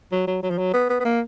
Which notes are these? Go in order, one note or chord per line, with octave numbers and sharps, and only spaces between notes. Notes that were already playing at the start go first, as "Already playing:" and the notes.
F#3
F#3
F#3
F3
F#3
B3
B3
B3
A#3